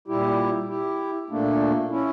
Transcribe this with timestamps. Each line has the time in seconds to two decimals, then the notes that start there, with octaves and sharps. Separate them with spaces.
0.08 A#2 G3 E4 G4
0.68 E4 G4
1.30 A#2 A3 A#3 D4
1.90 C#4 E4